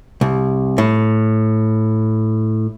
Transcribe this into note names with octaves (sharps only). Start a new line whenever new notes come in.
C2
A2